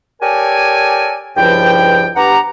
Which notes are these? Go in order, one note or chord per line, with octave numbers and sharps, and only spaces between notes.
G4 A4 A#4 C#5 D5 G#5
C#2 G2 F3 E4 G5
G2 B3 G4 F#5 A#5